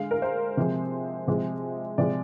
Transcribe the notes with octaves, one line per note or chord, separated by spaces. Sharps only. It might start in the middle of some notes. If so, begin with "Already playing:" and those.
Already playing: D3 G#3 F5
A#4
C5
C3 F3 G#3
C3 F3 G#3
C3 F3 G#3 D5